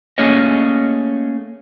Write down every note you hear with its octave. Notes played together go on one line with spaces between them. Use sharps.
A3 A#3 C#4 G#4 C#5 D#5